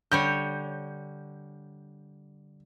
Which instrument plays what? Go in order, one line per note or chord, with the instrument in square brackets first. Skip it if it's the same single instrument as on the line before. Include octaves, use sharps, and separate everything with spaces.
[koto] D3 G3 C#5 [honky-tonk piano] G6